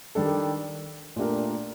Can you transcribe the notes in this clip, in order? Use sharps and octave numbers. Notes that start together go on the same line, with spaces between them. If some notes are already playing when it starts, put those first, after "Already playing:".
D#3 G3 D4 A4
A#2 A3 D4 G4 A#4